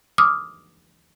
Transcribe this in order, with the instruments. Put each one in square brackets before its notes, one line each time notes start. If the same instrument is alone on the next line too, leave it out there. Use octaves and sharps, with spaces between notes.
[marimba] D6 D#6 F6